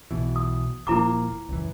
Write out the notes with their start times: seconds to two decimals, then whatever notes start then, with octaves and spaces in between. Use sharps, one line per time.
0.11 B1 B2 E3
0.36 D#6
0.87 D#1 F3 A#3 E4 A#5 D6
1.49 C#2 F#2 E3